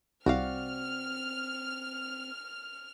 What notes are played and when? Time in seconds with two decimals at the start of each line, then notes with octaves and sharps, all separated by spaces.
0.26 C2 C4 F#4 D5 F5 F6